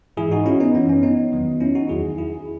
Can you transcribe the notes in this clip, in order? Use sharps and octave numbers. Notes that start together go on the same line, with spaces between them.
G#2 E3 E4 G#4
D#4 F#4
C#4 E4
B3 D#4
F#2 E3 C#4
C#4
B3 D#4
E2 D#3 F#3
C#4 E4
D#4 F#4
E2 D#3 F#3 E4 G#4
E4 G#4